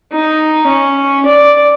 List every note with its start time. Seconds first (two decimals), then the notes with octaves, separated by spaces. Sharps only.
0.12 D#4
0.67 C#4
1.25 D5